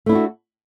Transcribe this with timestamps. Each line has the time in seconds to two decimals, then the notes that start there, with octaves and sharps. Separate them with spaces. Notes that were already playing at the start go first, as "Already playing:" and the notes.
0.06 A3
0.09 E4
0.12 D4
0.15 F#4